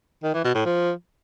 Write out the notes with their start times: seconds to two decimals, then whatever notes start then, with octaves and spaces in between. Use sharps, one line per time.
0.23 D#3
0.34 E3
0.44 B2
0.55 A2
0.65 F3